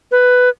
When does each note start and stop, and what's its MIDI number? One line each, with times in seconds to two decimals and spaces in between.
0.11 0.49 71